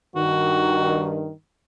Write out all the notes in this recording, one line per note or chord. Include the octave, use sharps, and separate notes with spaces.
G2 D#3 F#4